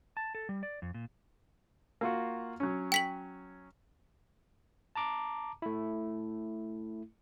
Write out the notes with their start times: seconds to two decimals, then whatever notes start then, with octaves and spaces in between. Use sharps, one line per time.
0.17 A5
0.35 A4
0.49 G3
0.63 D5
0.82 F2
0.94 A#2
2.01 A#3 F4 F#4
2.60 F#3 C#4
2.92 G5 B6 F#7
4.96 A5 A#5 D6
5.62 A3 E4